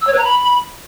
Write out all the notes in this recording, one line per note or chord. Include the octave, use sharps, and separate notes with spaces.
E6
C#5
B4
A#5
B5